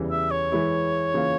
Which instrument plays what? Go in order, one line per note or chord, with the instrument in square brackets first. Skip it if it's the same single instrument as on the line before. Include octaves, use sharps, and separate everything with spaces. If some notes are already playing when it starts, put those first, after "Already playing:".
Already playing: [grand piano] E2 C#3 E3 G3
[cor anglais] E5
C#5
[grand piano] E3 G#3 E4
C#3 E3 A#3 F4